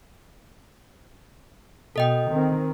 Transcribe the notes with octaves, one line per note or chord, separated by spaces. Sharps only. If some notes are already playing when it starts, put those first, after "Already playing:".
B2 A4 D#5 G5
D#3 C4